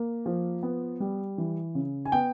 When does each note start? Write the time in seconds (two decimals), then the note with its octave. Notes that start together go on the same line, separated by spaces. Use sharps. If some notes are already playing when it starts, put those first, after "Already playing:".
Already playing: A#3
0.26 F3
0.63 B3
1.00 G3
1.38 E3
1.75 C#3
2.05 G#5
2.12 B3 G5